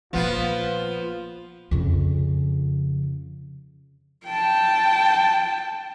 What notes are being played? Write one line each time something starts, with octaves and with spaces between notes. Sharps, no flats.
A#1 F3 A#3 B3 F4
F2 C#3
G5 A5